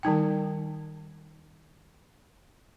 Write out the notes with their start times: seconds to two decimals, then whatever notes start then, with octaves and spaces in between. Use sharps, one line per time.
0.03 D#3 G3 D#4 G5